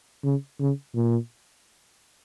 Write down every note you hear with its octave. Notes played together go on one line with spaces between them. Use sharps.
C#3
C#3
A#2